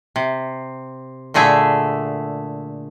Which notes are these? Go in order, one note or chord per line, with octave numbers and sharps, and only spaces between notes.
C3
A#2 D3 A3 G#4 E5